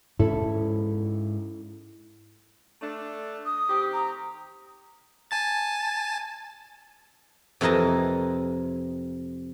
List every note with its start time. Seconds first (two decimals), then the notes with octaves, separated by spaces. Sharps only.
0.19 G#2 C#4 E4 A4
2.81 A3 D4
3.46 D#6
3.68 D#3 C4 G4
3.93 A#5
5.31 G#5 A5 A6
7.61 F2 C3 E3 A#4 D#5 A5